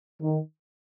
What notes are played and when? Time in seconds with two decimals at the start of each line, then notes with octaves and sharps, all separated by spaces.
0.22 D#3